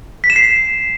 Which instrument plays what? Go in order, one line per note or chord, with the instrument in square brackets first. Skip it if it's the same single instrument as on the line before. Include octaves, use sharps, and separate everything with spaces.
[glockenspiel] B6
E7
C7